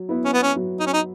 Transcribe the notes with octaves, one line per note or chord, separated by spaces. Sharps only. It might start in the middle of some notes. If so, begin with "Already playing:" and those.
Already playing: F#3
B3 E4
C#4
B3
C#4
F#3
D#4
C#4
D#4